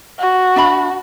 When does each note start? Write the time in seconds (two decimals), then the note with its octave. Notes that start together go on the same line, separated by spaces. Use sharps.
0.19 F#4
0.56 D4 E5 B5